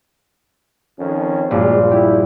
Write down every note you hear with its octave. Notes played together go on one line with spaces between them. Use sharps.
F2 D#3 C#4
A#1 G2 F#3 G#3 F4
E4 G4